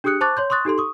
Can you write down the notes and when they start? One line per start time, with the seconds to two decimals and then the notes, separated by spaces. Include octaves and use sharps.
0.04 D4 G4 G#4 D#6 F#6 C#7
0.21 C5 A5 C#6 D6 F#6 A6
0.37 C#5 C6 G6
0.50 C6 C#6 D#6 F#6 A6
0.65 D#4 G4 A4 C6
0.78 C#6 D#6